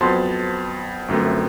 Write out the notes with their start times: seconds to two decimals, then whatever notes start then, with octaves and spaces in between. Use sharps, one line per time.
0.01 F2 F#3 B3 C5 A5 C6
1.08 G1 F#2 A3 C4